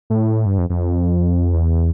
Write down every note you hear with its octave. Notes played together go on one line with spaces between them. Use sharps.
A2
G2
F2
F2
E2